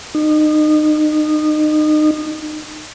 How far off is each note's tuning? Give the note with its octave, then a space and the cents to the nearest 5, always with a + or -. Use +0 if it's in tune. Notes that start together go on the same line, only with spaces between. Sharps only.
D#4 -30